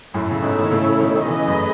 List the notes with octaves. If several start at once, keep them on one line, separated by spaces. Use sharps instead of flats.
F#2 A2 A3 E4 A4 C#5
C#3
G#2 B2
D#3
A2 C#3
B2 D#3
D#3
C#3 E3 A3 C#4 G#4 B4 D#5
F#2